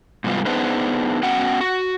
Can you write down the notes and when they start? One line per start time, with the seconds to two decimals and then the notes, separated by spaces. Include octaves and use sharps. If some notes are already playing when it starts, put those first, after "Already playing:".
0.24 G#2 C3 G3 B3 F4
0.46 B3 D4 D#4 G#4 B4 C5
1.23 B3 C#4 F#4 F#5 G5
1.61 F#4